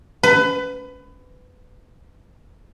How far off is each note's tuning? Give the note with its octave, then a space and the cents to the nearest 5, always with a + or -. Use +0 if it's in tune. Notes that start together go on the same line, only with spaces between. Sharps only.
B4 +25